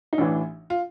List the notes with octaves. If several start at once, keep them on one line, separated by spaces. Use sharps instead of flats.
D#4
A1 A2 E3 D4
F4